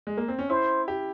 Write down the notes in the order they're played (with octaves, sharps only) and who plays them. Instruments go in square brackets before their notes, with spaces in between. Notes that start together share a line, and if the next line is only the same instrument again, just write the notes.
[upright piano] G#3
A#3
C4
C#4
[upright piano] E4 [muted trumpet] C5
[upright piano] G4